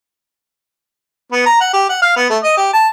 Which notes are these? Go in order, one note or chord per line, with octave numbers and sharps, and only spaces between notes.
B3
A#5
F#5
G4
F#5
F5
B3
A3
D#5
G4
A5